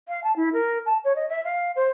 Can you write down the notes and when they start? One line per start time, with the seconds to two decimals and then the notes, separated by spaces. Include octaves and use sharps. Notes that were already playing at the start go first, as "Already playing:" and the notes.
0.08 F5
0.24 A5
0.36 E4
0.53 A#4
0.86 A5
1.04 C#5
1.16 D#5
1.29 E5
1.44 F5
1.76 C5